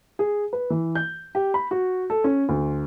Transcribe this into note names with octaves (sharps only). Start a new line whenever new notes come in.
G#4
B4
E3
G6
G4
B5
F#4
A4
C#4
D2